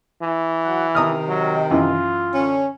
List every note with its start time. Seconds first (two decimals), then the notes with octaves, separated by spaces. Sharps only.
0.22 E3
0.64 F#3 F#5
0.95 C3 D#3 A#5 D#6 F6
1.28 F#3
1.71 F#2 E3 F4
2.35 D3 C#4